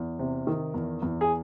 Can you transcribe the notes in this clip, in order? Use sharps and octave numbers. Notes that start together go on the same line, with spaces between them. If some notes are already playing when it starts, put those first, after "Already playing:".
Already playing: E2
C3
D#3
E2
E2
G#4